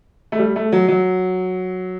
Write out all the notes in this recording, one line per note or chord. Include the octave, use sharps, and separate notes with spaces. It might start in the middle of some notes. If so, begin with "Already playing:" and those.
A3
G3
A3
F#3
F#3